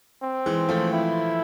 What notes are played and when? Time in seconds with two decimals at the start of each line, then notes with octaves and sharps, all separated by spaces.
0.22 C4
0.46 E3 G#3
0.69 F3 A3
0.93 E4